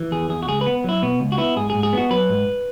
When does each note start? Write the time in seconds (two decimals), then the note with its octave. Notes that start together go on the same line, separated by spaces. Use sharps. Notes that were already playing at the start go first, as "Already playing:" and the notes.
Already playing: E3
0.12 E2 G#4
0.29 E2 G#4
0.43 F#4
0.48 C#2 G#4
0.61 B4
0.66 B3
0.84 F#3 E4
1.02 B2 B3
1.20 C#2
1.32 F#4
1.38 B3 E4
1.56 G#2 G#4
1.70 G#4
1.75 G#2
1.83 G#4
1.93 B3 F#4
2.11 F#3 B4
2.29 G#2